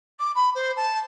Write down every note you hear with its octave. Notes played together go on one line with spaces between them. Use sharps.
D6
B5
C5
A5